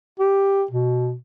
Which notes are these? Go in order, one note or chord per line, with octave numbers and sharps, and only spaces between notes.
G4
B2